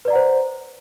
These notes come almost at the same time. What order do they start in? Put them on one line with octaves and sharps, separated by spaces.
B4 D5 A#5 F#5 C5